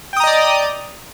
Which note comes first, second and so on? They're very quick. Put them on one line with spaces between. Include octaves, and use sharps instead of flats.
G5 D#6 A#5 D#5 D5